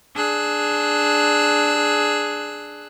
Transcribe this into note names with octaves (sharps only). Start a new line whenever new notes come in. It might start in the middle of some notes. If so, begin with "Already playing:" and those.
D4 G#4 E6 F#6